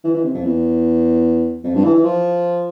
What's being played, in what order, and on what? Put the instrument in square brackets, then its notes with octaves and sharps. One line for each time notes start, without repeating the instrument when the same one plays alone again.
[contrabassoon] E3
E3
C3
F2
E2
F2
G2
E3
E3
F3